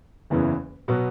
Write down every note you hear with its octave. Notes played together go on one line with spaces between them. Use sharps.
F#1 E2 C#3 E3 B3
B2 F#3 B3